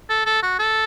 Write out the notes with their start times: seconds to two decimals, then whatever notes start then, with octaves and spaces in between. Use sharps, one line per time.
0.10 A4
0.26 A4
0.43 F#4
0.59 A4